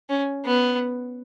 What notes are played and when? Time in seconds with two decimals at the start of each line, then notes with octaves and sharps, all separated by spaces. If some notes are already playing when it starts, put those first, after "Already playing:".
0.09 C#4
0.45 B3